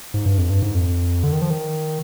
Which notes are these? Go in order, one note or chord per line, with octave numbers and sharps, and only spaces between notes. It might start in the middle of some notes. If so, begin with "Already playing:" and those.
G#2
G2
F2
G2
G#2
F2
D3
D#3
F3
D#3